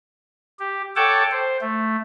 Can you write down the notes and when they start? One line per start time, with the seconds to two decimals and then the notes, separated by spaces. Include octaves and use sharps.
0.59 G4
0.96 A4 C#5 F#5 G5 A5 D6
1.31 C5
1.61 A3